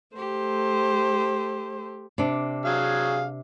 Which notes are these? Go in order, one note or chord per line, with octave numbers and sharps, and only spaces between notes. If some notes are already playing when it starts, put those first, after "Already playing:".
A3 G4 C5
C3 D4
F#3 G#4 F5